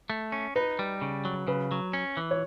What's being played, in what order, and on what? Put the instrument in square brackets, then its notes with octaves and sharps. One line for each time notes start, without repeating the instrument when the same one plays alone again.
[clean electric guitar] A3
C#4
[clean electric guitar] D#4 [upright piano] B4
[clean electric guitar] G3
C#3
F#3
[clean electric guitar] C#3 [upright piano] B4
[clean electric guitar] F#3
C#4
E3
[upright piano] C#5